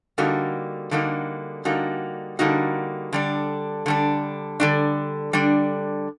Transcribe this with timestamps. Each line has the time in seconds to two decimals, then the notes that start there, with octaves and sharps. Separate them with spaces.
0.18 D3 G3 A#3 D#4 F#4
0.91 D3 G3 A#3 D#4 F#4
1.65 D3 G3 A#3 D#4 F#4
2.39 D3 G3 A#3 D#4 F#4
3.13 D3 G3 D4
3.86 D3 G3 D4
4.60 D3 G3 D4
5.33 D3 G3 D4